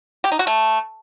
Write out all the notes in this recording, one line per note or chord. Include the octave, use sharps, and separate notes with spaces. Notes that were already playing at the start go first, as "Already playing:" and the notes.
G4
D#4
F#4
A3